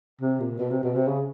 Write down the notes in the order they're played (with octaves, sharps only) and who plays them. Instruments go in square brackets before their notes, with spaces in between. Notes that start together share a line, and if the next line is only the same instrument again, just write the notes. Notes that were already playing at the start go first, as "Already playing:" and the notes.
[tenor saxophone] C3
A#2
B2
C3
B2
C3
C#3